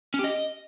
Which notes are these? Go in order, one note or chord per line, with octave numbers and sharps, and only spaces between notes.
C#4
G4
D#5